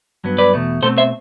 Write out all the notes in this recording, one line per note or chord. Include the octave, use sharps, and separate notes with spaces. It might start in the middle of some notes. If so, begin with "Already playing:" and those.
G2 F#3 B3
B4 D5
E2 B2 A3
B2 A3 C4 A4 C5
C5 E5